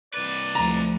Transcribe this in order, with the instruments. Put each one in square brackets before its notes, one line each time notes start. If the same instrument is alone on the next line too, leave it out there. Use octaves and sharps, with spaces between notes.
[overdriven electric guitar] C2 B4 [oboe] D5
[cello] D2 F3 [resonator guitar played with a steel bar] A#5